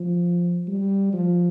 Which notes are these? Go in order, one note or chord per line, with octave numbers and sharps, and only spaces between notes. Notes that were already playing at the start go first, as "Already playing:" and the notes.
Already playing: F3
G3
F3